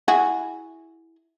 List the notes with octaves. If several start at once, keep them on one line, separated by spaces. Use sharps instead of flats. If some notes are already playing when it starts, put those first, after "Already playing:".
E4 F#4 G#4